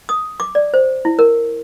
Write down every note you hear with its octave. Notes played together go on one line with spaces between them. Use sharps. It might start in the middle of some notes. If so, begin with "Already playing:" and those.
D#6
D6
D5
C5
E4
A#4